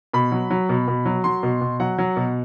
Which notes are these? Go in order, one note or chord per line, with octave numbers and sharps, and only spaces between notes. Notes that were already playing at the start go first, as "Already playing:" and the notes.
B2 B5
F#3
F#3
B2
B2
F#3
F#3 C6
B2
B2
F#3 F#5
F#3
B2